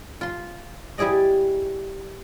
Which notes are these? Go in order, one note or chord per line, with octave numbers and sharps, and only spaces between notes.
F4 C6
G3 E4 G#4 D5 D#5